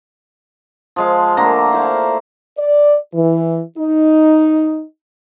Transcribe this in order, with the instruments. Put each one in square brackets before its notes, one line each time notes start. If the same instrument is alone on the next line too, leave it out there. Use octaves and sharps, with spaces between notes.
[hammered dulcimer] F3 G#3 F5
D3 A3 A#3 A#5
E4 C5 F5
[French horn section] D5
E3
D#4